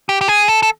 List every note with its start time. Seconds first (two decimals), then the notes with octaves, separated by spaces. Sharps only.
0.09 G4
0.21 G4
0.28 G#4
0.48 A4
0.63 A4